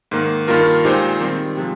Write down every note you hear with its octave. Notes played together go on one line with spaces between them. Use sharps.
G#2 D#3 A#3
G2 D#3 A#3 F4 A#4
A#2 G#3 D#4 G4 C5
D#3 G3 C4
C3 F3 G#3